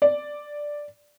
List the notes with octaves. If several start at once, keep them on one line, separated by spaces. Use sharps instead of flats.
D5